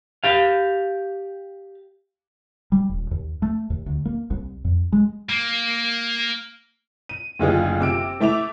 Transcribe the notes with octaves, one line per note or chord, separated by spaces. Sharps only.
G4 F5
G3
D#1
D#2
A3
D#2
D2
A#3
C2
F2
G#3
A#3
D#7
F#1 D2 F4 G#4
C3 E6 D7
A3 E4 E5 D6 F7